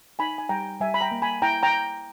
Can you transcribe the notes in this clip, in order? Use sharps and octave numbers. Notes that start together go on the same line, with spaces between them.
D#4 G#5 B5
G#5
G3 G5 A#5
G3 E5 G#5
B5
G5 A#5
A#3
G#5 B5
E4 G5 A#5
G5 A#5